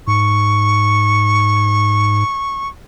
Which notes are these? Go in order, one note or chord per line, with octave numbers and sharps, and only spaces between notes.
G#2 C#6